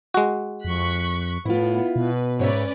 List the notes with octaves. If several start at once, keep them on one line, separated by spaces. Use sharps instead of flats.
G#3 F#4
F2 C#6 F#6 B6
A2 B3 E4 F4
B2 B4
G#2 C#4 B4 C#5 D5 E5